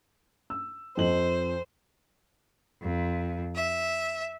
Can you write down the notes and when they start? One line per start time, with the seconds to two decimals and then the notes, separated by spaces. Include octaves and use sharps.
0.50 E6
0.97 F2 C5 D#5 F#7
2.81 F2
3.56 E5